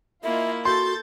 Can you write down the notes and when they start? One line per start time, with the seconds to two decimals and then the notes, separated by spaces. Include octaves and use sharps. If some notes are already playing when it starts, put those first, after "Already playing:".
0.23 A#3 E4 F4 D#5 E5 G#5
0.65 F#4 A4 C6 G6 A6